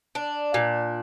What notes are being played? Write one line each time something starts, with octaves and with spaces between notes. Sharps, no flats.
D4
A#2